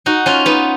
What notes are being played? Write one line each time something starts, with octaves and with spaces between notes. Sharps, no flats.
D#4 F#4
C#4 F4
B3 D#4